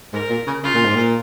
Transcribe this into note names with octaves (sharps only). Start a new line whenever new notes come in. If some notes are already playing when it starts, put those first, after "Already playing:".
G#2 A#4
A#2
C#3
C#3 F4
A#2
G#2
A#2